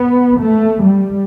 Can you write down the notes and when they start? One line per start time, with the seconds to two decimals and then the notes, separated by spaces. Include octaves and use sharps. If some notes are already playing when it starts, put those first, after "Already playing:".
Already playing: B3
0.42 A3
0.82 G3